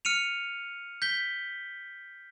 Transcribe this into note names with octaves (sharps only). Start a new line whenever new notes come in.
F6 C#7 D#7 F7
G6 B6 G7